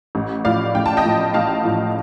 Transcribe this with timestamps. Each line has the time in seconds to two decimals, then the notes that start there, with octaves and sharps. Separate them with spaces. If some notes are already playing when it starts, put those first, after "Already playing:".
0.15 A1
0.45 A2 F3 D5 F5
0.75 A1 G5
0.86 A5
0.97 D#5 G5
1.04 A2 F3
1.34 A1 F5 A5
1.64 A2 F3